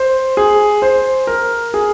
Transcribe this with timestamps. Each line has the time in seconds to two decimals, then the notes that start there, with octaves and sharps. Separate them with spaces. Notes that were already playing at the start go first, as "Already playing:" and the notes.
Already playing: C5
0.37 G#4
0.82 C5
1.27 A#4
1.74 G#4